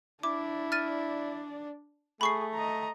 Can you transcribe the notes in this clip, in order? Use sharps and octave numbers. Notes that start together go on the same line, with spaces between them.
D4 E4 D5 D6
F6 A6 D#7
A3 G#4 B5 C#6 C7
D#5 A#5